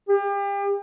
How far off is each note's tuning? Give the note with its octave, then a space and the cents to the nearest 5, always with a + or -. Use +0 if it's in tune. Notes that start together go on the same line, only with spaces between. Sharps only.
G4 +35